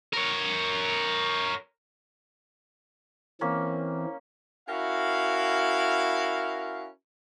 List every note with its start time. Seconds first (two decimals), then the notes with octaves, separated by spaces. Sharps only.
0.13 A#4 C#5
3.41 E3 A#3 C4 C#4
4.68 C#4 E4 F#4 A#4 F5